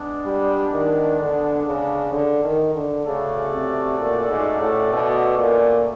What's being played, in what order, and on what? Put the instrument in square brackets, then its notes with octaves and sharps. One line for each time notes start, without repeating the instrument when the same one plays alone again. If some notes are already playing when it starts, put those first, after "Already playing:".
Already playing: [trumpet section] G#3 B3 D4
[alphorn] G3
D#3
D3
C#3
D3
D#3
D3
[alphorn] C#3 [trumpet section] A3 C#4 F#4 A4 D5
[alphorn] C3
A#2
G#2
A2
B2
A#2